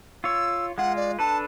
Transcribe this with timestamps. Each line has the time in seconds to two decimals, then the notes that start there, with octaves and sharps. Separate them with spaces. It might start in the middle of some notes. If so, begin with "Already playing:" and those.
0.24 F4 C#5 E6
0.78 G#3 F4 F#5
0.96 D5
1.19 D4 A4 B4 A5